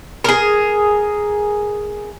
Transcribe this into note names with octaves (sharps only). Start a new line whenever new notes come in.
G#4 A#4